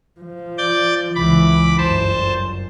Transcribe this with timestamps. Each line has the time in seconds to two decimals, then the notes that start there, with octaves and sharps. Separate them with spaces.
0.20 F3
0.58 D5 G6 A6
1.15 C#2 E3 B5 D6
1.78 G1 F#2 C5 A5